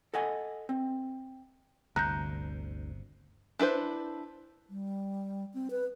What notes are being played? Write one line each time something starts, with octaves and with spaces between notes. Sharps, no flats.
A4 D#5 F#5 G#5
C4
G1 D2 C3 A#5 F#6 G6
D4 E4 B4 C5
G3
C4
B4